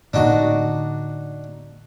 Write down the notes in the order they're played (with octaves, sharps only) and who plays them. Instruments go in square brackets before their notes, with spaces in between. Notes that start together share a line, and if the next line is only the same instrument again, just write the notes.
[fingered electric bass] A2 D3 A#3 [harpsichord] D4 D#4 F#4